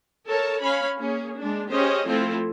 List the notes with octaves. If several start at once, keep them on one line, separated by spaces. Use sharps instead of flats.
A4 A#4 C#5 A5
C#4 C#5 F5 B5
A#3 C#4 G#4
G#3 D4
C#4 G4 G#4 C5 D#5
F3 A3 C4 E4 F4 A4